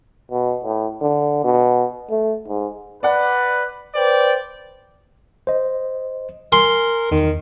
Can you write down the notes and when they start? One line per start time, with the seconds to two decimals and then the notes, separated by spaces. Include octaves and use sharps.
0.31 B2
0.64 A2
1.01 D3
1.44 B2
2.10 A3
2.48 G#2
3.03 B4 D5 F#5
3.95 B4 C5 D5 G5
5.47 C5 D#5
6.52 A#4 G#5 C6
7.11 E2 D#3